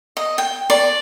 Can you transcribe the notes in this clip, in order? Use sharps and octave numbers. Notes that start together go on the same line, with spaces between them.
D#5
G5
D5